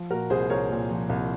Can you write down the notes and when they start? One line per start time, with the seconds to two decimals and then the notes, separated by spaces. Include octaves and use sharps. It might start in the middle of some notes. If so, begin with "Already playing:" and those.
Already playing: F3
0.10 A#2 F#4 A#4
0.30 C2 G#4 C5
0.50 C2 A#4 C#5
0.70 A#2
0.90 F3
1.09 C2